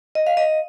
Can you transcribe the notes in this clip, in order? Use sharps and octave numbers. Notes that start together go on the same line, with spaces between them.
D#5
F5
D#5